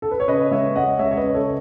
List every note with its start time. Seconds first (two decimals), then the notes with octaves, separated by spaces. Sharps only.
0.02 A4
0.11 B4
0.20 C#5
0.28 C#3 B4 D#5
0.51 G#3 C#5 E5
0.76 C#2 D#5 F#5
0.99 C#2 C#5 E5
1.11 C#5
1.17 B4 D#5
1.22 C#3
1.34 A4 C#5